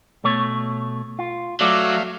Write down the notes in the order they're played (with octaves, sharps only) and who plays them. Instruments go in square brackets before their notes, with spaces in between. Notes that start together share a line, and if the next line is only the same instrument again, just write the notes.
[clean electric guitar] B2 A3 C#5
F4
[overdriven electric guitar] F#3 [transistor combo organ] A3 E5 F5 [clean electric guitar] D5